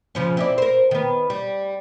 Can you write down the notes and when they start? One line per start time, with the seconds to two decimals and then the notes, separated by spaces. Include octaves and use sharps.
0.15 C#3 F3 C#4
0.37 C4 E4 D5
0.58 A#4 C5
0.91 D#3 B3
1.30 G3